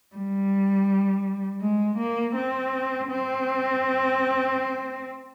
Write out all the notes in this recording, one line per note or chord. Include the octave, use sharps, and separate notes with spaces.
G3
G#3
A#3
C4
C4